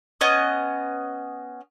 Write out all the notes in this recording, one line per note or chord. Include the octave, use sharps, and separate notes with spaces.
B3 C#4 D#5 D#6